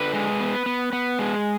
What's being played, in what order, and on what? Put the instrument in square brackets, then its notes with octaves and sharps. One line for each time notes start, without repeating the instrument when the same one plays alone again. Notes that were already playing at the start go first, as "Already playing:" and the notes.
Already playing: [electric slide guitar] D3 B4
G#3
B3
B3
B3
G#3